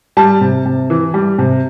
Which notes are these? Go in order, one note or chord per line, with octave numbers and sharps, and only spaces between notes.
G3 A5
C3
C3
E3
G3
C3